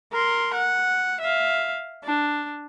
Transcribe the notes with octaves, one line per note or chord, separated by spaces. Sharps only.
A#4 C6
F#5
E5 F5
D4